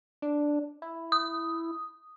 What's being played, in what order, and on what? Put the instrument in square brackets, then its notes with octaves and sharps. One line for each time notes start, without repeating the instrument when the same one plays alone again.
[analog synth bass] D4
E4
[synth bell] D#6